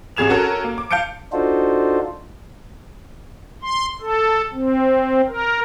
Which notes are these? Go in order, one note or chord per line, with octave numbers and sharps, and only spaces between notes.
A1 C3 G#4 G#6 E7 F7
C#4 F#4 A4 A#4
A#3
D6
F5 A5 G6 C#7 D7
D4 D#4 F4 F#4 A4 C5
C6
A4
C4
A#4